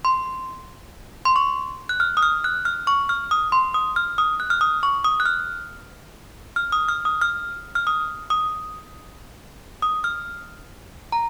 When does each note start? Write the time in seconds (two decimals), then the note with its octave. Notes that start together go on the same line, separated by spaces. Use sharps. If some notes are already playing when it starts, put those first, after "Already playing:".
0.05 C6
1.25 C6
1.36 C#6
1.89 F#6
2.00 F6
2.17 D#6
2.22 F6
2.44 F#6
2.65 F6
2.87 C#6
3.09 F6
3.31 D#6
3.52 C6
3.74 D#6
3.96 F6
4.18 D#6
4.40 F#6
4.50 F6
4.61 D#6
4.83 C#6
5.04 D#6
5.20 F#6
5.26 F6
6.56 F6
6.72 D#6
6.88 F6
7.05 D#6
7.21 F6
7.75 F6
7.87 D#6
8.30 D#6
9.82 D#6
10.04 F6
11.12 A#5